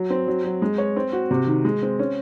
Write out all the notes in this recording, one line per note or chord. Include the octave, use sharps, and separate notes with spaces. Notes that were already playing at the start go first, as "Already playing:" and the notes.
Already playing: F#3
C4
F#3
F#3
G#3
C#5
C4
F#4
C3
D#3
G#3
C4
C#4